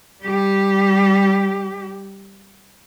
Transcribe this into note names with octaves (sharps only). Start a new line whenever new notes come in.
G3 G4